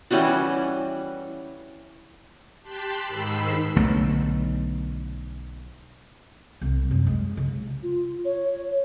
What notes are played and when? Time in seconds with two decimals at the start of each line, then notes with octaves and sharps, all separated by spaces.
0.11 E3 G3 C#4 F#4
2.63 G4 A5 C6 F#6 G6 B6
3.03 G#2 D#3 B5 E6 C7
3.76 B1 D3 A3
6.61 C2
6.91 F#2
7.07 G#3
7.37 C#3
7.83 F4
8.25 C#5